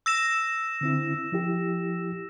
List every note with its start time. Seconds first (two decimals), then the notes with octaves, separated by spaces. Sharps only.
0.06 E6 A#6 E7
0.81 D3 C4 E4
1.32 F3 E4 G4